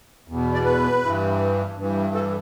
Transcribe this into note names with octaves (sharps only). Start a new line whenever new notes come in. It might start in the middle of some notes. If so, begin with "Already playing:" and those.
E2 B2
D5
B4
G2 E3
G2 E3
A4